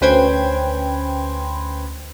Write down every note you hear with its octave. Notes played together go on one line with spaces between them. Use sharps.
D2 C#4 B4 C5 G5 G#6